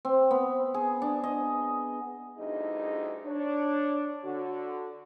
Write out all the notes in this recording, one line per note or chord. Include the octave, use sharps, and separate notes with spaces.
C4
B3
G#4
D4
D#5
D2 G2 D#4 E4 G#4 D#5
D4 C#5
D3 F#4